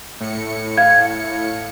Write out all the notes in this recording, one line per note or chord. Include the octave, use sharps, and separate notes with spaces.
A2 C#7
F5 G#6